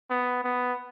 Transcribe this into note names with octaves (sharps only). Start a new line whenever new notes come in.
B3
B3